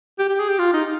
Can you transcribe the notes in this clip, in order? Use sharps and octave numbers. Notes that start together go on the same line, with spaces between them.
G4
G4
G#4
G4
F4
D#4